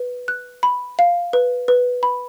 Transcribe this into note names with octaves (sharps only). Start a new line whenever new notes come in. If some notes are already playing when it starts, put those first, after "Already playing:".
Already playing: B4
F#6
B5
F5
B4
B4
B5